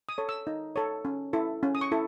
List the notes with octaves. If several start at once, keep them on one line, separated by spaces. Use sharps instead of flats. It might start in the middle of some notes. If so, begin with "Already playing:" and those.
D#6
A4 C#5
E6
D#4
A4 C#5
C#4
E4 A4
C#4
D#6
C#6
E4 A4